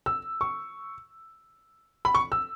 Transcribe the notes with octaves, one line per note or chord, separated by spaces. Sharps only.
E6
C#6
B5
C#6
E6